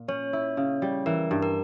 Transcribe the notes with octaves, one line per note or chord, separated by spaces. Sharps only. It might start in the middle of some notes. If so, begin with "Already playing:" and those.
Already playing: A#2
C#4 C#5
E4
C#3
G3
E3 A#4
G2
A#4